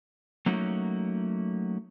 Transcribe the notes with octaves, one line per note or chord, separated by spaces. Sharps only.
F#3 A3 A#3 C#4 D#4 F#4